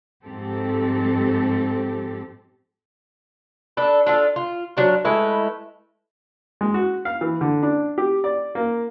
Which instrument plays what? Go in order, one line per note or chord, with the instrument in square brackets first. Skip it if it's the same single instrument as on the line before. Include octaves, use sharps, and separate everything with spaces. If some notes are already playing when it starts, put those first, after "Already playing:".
[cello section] G#2 F3 C4 G4 A4
[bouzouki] D4 A4 B4
D4 F4 A4
F4
F#3 D4 F4
G#3 A3 E4 B4
[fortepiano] G#3
F#4
F5
E3
D3
D4
G4
D5
A#3